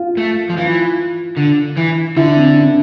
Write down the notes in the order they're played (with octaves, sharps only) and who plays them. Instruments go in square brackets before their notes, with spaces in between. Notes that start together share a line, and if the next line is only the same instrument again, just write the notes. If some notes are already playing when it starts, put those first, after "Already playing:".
Already playing: [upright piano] F4
[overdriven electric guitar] A3
F3
[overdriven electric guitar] E3 [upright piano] F4
[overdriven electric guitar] D3
E3
[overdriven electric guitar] D3 [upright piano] E4
[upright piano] C4
D4